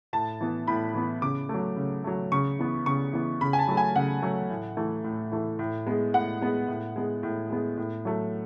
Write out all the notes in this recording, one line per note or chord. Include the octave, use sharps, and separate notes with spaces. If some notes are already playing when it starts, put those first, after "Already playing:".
A2 A5
E3 B3
A2 B5
E3 B3
C#3 D6
F#3 A3
C#3
F#3 A3
C#3 C#6
E3 B3
C#3 C#6
E3 B3
C#3 B5
G#5
A5
F#3 A3
G#5
C#3 F#5
F#3 A3
A2
E3 A3
A2
E3 A3
A2
G#3 B3
A2 F#5
G#3 B3
A2
G#3 B3
A2
G#3 B3
A2
F#3 A3